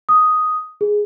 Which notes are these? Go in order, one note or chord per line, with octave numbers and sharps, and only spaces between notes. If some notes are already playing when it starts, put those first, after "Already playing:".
D#6
G#4